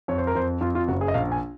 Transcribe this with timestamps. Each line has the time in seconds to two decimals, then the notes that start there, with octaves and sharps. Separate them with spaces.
0.08 F2 C#5
0.18 C5
0.27 A#4
0.35 F2 C5
0.61 F2 F4
0.75 F4
0.88 F#1 F#4
1.01 G#4
1.08 D#5
1.14 A#1 F5
1.32 G#5